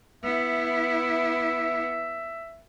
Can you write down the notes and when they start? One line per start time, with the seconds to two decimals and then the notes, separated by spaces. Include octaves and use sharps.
0.23 B3 E4 E5